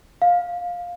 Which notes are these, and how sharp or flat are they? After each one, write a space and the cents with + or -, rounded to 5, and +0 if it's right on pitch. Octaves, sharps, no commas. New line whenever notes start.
F5 +15